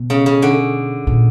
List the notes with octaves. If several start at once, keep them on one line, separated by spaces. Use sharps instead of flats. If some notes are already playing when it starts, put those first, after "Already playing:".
Already playing: B2
C#3
C#3
D3
A#2